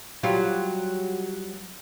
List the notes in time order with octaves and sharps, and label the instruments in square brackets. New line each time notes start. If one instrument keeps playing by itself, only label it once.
[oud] F#3 G3 F4